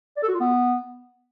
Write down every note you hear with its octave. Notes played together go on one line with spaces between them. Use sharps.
D5
A4
F#4
F4
B3